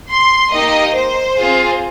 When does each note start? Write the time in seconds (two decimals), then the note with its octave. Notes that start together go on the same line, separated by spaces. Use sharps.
0.11 C6
0.53 A#3 D#4 G4 D#5
0.95 C5
1.37 C4 F4 G#4